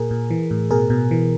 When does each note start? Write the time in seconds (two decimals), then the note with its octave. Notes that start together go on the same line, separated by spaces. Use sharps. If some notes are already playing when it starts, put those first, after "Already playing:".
Already playing: A#2 G#4 A#4
0.11 A#2
0.31 E3
0.51 A2
0.70 B2 G#4 A#4
0.90 B2
1.11 E3